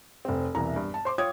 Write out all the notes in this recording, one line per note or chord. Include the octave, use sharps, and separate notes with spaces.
F1 C4
E1 C2 E3 E5 A#5
G2
A5
C5 C6 D6
F4 C#5 G5 D#6 G#6